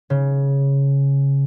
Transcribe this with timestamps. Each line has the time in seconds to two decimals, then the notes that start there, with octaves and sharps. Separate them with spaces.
0.10 C#3